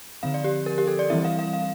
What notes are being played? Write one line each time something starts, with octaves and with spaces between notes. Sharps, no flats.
D3 F3 C4 F5
D5
G4
A#4
G4
A4
D5
E3 G3 C4 E4 E5
F5
F5
F5